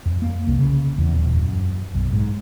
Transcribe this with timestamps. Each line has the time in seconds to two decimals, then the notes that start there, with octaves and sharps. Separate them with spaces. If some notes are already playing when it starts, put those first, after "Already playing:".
0.06 F2
0.22 A#3
0.47 C2
0.59 C#3
0.98 E2
1.14 D#1
1.37 F#2
1.94 B1
2.13 G#2